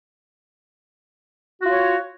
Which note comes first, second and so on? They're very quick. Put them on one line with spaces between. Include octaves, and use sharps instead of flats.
F#4 F4 C#5